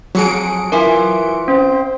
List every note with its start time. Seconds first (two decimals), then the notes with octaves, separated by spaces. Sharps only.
0.15 F2 F#3 G#4 C#7 D7
0.72 E3 E4 F4 A#4 G#5
1.48 C4 C#4 C5 G5